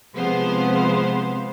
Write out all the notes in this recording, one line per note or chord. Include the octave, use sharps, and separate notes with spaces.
C3 F3 G#3 B3 C5 F5